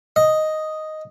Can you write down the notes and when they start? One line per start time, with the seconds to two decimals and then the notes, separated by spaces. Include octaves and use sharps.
0.16 D#5